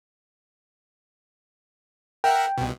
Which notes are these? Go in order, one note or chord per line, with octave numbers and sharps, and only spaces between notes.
A#4 E5 F#5 G5
C2 B2